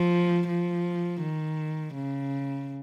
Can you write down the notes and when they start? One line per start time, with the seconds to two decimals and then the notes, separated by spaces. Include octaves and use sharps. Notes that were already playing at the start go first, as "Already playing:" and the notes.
Already playing: F3
0.48 F3
1.21 D#3
1.95 C#3